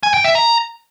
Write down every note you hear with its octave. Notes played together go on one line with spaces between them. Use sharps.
G#5
G5
E5
A#5